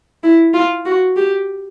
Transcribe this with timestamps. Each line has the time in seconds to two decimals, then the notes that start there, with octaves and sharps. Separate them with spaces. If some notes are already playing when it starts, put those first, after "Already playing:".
0.23 E4
0.54 F4
0.85 F#4
1.16 G4